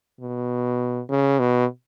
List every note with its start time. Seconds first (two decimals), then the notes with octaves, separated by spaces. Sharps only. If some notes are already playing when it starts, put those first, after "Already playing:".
0.20 B2
1.10 C#3
1.39 B2